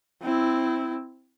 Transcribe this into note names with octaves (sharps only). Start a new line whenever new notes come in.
C4 E4